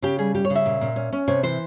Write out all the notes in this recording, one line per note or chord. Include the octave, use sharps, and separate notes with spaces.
C#3 G4
G3 G#4
G3 G4
C#5
C#3
E5
A#2
A#2
C#4
C#4
C3 C#5
E3 C5